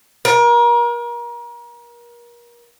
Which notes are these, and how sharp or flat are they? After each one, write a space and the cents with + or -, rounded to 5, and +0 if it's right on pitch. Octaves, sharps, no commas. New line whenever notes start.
A#4 +35